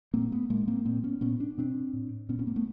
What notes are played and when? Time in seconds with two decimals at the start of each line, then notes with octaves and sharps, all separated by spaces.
0.14 A#2 A#3 C4
0.32 A3 B3
0.50 A2 G#3 A#3
0.68 A#3 C4
0.85 A#2 A#3 C4
1.03 B3 C#4
1.21 A#2 B3 C#4
1.40 D4
1.58 B2 C4 D4
1.93 A2
2.29 A#2 B3 C#4
2.39 B3 C#4
2.47 A#3 C4
2.56 A3 B3